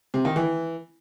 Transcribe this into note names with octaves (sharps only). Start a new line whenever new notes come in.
C3
D#3
E3